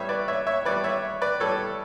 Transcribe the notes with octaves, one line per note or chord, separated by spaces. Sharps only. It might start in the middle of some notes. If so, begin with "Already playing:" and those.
Already playing: A2 G3 B3 C#5 E5
B4 D5
C#5 E5
C#5 E5
A2 G3 B3 B4 D5
C#5 E5
B4 D5
A2 G3 B3 A4 C#5